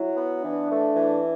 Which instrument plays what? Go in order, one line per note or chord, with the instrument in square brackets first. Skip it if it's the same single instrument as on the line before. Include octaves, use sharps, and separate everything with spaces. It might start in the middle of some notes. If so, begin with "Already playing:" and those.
Already playing: [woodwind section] F#3 [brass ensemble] E4
[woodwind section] B3
[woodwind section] E3 [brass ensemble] D4
[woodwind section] A3
E3